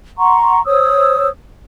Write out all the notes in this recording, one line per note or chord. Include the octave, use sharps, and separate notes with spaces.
F#5 A#5 C6 C#6
C5 C#5 D#6 E6